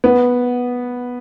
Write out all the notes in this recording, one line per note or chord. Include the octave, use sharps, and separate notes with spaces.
B3